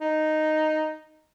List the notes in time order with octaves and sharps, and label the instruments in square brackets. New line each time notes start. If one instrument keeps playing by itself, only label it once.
[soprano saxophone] D#4